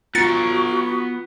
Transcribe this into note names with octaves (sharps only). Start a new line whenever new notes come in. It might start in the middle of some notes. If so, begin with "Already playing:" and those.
B3 F4 F#4 B4 A#5 A6 C#7